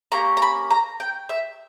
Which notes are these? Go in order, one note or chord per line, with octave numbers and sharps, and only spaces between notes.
A#3 C#4 G4 A#5
A#5
B5
A#5
G5
E5